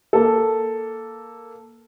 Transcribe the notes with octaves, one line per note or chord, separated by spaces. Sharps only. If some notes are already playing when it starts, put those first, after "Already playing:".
A#3 A4